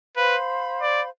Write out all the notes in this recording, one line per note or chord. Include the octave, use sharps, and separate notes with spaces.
B4 C5 F5 B5
D5